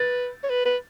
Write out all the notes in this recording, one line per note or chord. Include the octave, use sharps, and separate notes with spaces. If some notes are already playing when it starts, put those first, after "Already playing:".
Already playing: B4 A6
C#5
B4
B4